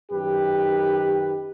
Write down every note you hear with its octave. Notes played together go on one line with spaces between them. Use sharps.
F#2 D#3 G4 B4